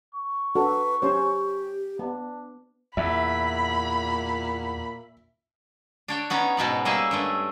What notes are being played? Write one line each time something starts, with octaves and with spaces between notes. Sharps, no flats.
C#6
D4 F#4 A4 B4
C#4 G4 C5
B3 D4
E2 A#2 E5 B5
D4 C#5 G5
B3 C#4 D#4 C#5
G#2 B2 B3 F#5
G3 A#3 C#4 G#4 D#5 E5
G2 G#3 A3